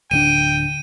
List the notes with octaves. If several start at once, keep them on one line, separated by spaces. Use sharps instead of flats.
D1 D3 D4 G5 D#7